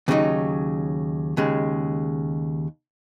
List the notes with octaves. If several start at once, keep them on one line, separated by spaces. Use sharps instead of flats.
D#2 C#3 F#3 D#4
D#2 C#3 G#3